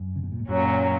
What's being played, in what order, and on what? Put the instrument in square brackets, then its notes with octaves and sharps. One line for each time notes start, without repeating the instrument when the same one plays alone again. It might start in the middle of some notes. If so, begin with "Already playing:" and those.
Already playing: [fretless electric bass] F#2
C#3
B2
A#2
G#2
[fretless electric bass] F#2 [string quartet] A#2 F#3 C#4